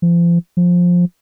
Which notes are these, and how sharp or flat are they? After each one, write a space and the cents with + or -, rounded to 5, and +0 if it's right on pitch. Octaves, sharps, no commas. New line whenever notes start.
F3 -35
F3 +15